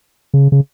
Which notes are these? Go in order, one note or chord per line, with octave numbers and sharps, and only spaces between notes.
C#3
C#3